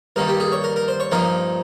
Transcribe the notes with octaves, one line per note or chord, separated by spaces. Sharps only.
G2 D#3 G3 A#3 A#4
G4
G#4
C#5
A#4
A#4
C5
C#5
G2 F3 A#3 D#4 A#4